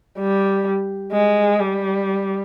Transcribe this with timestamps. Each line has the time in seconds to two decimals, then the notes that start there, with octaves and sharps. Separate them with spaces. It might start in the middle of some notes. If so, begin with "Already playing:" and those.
0.19 G3
1.12 G#3
1.60 G3